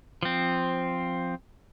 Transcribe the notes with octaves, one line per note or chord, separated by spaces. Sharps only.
F3 C4